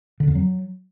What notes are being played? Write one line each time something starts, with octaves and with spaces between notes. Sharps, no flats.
D3
F2
F#3